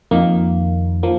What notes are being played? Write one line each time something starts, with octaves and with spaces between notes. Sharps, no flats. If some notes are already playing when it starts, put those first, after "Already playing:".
F2 D#3 A#3
F3 A#3